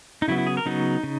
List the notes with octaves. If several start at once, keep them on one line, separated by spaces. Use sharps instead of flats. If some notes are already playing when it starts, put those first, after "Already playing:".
D#4
C#3 F#3 B3 E4
E4
G#4
A#4
C#3 F#3 B3 D#4
C#3